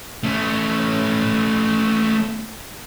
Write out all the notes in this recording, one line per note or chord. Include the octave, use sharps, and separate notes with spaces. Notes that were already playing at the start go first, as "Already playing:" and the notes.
A3 C#4